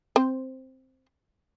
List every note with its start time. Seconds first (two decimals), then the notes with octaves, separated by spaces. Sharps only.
0.16 C4 C5